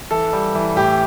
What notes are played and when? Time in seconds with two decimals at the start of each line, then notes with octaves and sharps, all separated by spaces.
0.11 E3 A4
0.33 G3
0.55 E3
0.76 A2 G4